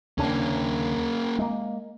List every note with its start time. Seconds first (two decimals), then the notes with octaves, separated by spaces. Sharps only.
0.18 D#2 C#3 A#3 C#4 D4
1.39 G#3 A#3